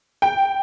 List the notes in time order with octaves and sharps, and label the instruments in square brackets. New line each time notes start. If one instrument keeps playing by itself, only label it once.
[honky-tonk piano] G5